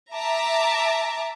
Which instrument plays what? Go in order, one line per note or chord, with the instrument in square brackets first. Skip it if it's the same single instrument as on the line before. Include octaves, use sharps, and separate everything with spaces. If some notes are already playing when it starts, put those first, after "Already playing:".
[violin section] E5 A5 A#5 D6